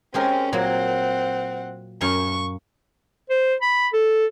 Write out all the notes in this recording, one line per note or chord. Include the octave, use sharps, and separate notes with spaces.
G#3 C4 C#4 G4 A#4
A#2 F#3 A#3 C4 F#5
F#2 F5 C#6
C5
B5
A4